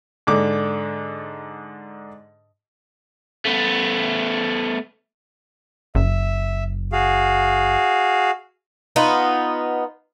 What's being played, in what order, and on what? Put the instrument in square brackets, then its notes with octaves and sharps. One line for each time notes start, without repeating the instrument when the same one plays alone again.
[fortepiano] G#2 D3 D6
[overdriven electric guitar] A3 B3
[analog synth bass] F#1 [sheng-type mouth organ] E5
[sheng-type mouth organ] F#4 G#4 F5
[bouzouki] B3 D#4 F4